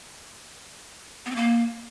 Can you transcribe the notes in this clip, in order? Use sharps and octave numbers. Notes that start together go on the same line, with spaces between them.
B3
C4
A#3